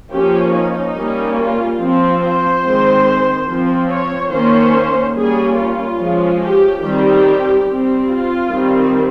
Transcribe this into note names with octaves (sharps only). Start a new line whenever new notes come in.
F3 A#3 C#4 G4
D#4
G3 A#3 C#4
F4
F3 C4
C5
D#3 G#3 C4
F3 C4
C#5
D#3 A#3 C#4 C5
G3 A#3 C#4 G#4
F4
F3 G#3 C#4
G4
D#3 G3 C4 G4
G3 C4
F4
D#3 G3 C4